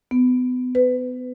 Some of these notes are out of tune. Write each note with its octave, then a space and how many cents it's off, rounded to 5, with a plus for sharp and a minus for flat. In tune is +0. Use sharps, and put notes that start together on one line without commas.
B3 +30
B4 +30